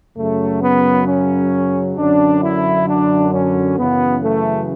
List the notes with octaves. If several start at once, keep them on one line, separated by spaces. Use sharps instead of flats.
F#2 C#3 F#3 A3
B3
C#4
F#2 D3 F#3 D4
E4
D4
C#4
F#2 C#3 E3 B3
A3